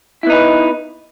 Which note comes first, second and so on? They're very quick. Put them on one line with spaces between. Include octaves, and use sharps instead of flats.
E4 B3 D#4 B4